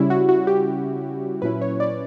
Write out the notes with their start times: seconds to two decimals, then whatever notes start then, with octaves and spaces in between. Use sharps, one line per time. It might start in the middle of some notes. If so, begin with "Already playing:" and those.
Already playing: C#3 G3 C#4 E4
0.10 F#4
0.29 F#4
0.47 G4
1.42 A#2 F#3 C#4 E4 B4
1.61 C#5
1.80 D5